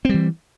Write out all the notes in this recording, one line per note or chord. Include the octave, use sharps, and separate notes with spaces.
E3 G3 C4